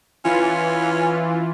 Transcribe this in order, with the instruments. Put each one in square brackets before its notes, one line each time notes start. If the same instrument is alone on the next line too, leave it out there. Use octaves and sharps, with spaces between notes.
[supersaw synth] E3 F4 [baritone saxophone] C#4